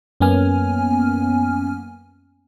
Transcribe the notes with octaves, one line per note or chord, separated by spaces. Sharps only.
F#2 A#3 B3 C#4 G#5 F6